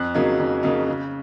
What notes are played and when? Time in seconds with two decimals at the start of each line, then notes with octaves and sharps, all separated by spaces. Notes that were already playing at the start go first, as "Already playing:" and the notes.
Already playing: F2 F#6
0.14 C#3 F#3 A#3 D#4
0.40 F2
0.63 C#3 F#3 A#3 D#4
0.88 C#3